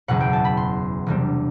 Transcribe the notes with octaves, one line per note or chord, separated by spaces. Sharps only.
F#1 E2 B2 F#5
G5
A5
B5
C6
E1 E2 C3 G3 D4